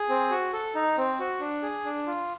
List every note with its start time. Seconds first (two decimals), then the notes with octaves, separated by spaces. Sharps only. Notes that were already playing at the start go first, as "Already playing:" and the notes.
Already playing: G#4
0.09 C4
0.31 F#4
0.53 A4
0.75 D#4
0.97 C4
1.19 F#4
1.40 D4
1.62 G#4
1.85 D4
2.07 F4